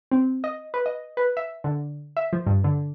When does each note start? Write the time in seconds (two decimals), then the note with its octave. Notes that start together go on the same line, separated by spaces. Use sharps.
0.11 C4
0.44 D#5
0.74 B4
0.86 D#5
1.17 B4
1.37 E5
1.64 D3
2.17 E5
2.33 F3
2.46 G2
2.64 D3